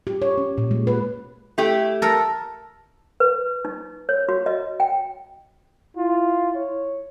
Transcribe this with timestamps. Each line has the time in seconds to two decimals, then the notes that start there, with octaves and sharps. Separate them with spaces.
0.07 G4
0.22 C#5
0.38 C#4
0.58 A#2
0.71 G#3
0.87 B4
1.58 A3 E4 G4
2.02 A4 A#4
3.20 B4
3.65 D#4
4.09 C#5
4.29 F#4
4.46 D#5
4.80 G5
5.97 E4 F4
6.55 C#5